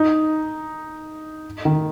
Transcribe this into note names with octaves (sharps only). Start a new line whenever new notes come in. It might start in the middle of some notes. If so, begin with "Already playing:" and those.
Already playing: D#4
D#3